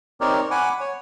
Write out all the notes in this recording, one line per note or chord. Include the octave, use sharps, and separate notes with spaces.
C4 D#4 G4 A#4 C#5 D5
F#5 G#5 B5 D6
C#5